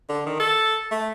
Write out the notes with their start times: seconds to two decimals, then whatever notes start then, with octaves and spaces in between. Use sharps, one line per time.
0.09 D3
0.26 D#3
0.40 A4
0.91 A3